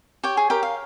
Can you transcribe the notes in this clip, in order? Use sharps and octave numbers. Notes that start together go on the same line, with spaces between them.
G4 C#5 G5
G#4 G#5
G4 A#4 G5
F5